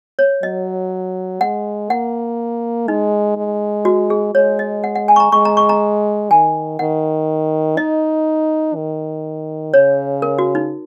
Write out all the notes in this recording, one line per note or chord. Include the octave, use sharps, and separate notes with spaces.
C#5
F#3 D#5
G#3 F#5
A#3 F#5
G#3 D#4
G#3
F#4
G#4
G#3 C#5
D#5
F#5
F#5
G#5
C#6
A#5
G#3 C#6
A#5
C#6
A#5
D#3 G#5
D#3 F#5
D#4 D#5
D#3
C#3 C#5
A#4
F#4
D#4